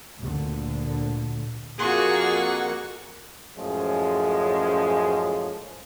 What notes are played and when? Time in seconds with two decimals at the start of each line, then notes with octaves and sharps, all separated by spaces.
0.18 D2 A#2 D3
1.79 F2 A#3 F4 F#4 G#4 F#5 C#6
3.57 F#2 A2 F3 G#3 C#4